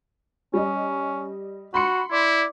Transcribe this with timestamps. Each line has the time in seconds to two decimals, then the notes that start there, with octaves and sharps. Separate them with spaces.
0.54 G3 C#4 D#5
1.74 F#4 B5 C6 C#7
2.12 E4 D5